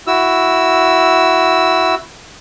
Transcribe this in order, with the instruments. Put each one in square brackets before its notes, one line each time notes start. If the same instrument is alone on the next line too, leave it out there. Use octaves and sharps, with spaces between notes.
[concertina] E4 F#4 E6